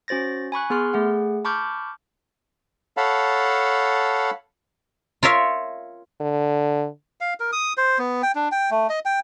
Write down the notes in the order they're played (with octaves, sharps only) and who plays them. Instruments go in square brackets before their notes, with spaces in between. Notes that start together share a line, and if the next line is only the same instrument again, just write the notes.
[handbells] C#4 F#4 C5 A6 A#6
G#5 B5 C#6 F#6
B3 G#4 C6 F6
A3 G#4 F#5
A5 B5 C#6 D6 F6 G6
[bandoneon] A4 C#5 F5 F#5 A5 B5
[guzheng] F4 A#4 C#5 E5 F5
[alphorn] D3
[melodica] F5
A#4
D#6
C5
B3
G5
D4
G5
A3
D#5
G5